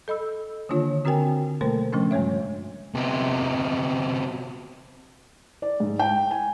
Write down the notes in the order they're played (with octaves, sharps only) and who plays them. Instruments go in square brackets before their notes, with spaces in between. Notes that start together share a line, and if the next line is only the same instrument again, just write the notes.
[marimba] A4 D#5 B5 E6
D3 D#3 A#3 D4 F4 C#5
D3 C4 F#4 A#4 G5 G#5
B2 F#3 A3 A#3 A#4 C5
C#3 F3 A3 C#4 D4
G2 G3 G#3 C#5 E5
[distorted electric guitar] C3 B3
[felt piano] D5
G#2
G5
G#5